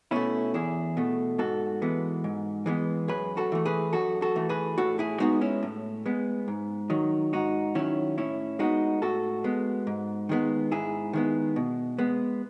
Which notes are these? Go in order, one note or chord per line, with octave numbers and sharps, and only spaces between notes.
B2 A3 C#4 E4
E2 E4 G#4
B2 A3
G#2 F#4 A4
E3 G#3 B3
G#2
E3 G#3 B3
F#2 G#4 B4
F#4 A4
E3 A3
G#4 B4
F#2 F#4 A4
F#4 A4
E3 A3
G#4 B4
A2 F#4 A4
E4 G#4
G#3 B3 D#4 F#4
C#4 E4
A2
G#3 B3
G#2
D#3 F#3
G#2 D#4 F#4
D#3 F#3 C#4 E4
A2 C#4 E4
G#3 B3 D#4 F#4
A2 F#4 A4
G#3 B3
G#2
D#3 G#3 B3
G#2 E4 G#4
D#3 G#3 B3
B2
G#3 B3